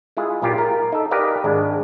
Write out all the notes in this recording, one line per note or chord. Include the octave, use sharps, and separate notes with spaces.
G#3 E4 F4 G#4
B1 A#2 F4 G4
A#4
D#4 A4
G4 A#4 B4 D5 D#5 F5
G#1 G#3 D4